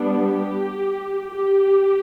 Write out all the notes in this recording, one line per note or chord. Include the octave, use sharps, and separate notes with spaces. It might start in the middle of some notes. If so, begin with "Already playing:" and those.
Already playing: G3 B3 D4
G4
G4